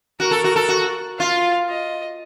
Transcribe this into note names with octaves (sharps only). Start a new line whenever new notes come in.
F#4 A#4
A4
F#4
A4
F#4
F4 F5
D#5